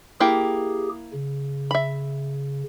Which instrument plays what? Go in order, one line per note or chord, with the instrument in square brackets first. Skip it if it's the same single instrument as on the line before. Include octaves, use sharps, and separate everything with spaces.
[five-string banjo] A#3 E4 G5 [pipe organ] G4 G#4
[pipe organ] C#3
[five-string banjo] E5 B5